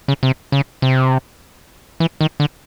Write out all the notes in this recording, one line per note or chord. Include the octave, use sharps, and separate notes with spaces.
C#3
C3
C#3
C3
E3
D#3
D3